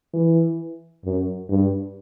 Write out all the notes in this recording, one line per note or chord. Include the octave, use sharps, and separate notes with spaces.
E3
F#2
G2